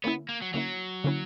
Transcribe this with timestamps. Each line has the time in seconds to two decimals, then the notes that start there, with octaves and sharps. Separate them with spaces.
0.04 D3 A#3 B3 C#4 E4
0.29 A#3
0.42 F#3
0.53 D3 F#3 A#3 C#4 E4
1.04 D3 A#3 C#4 E4